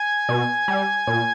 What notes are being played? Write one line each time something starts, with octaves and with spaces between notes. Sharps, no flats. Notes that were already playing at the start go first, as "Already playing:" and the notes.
Already playing: G#5
B2
G3
A#2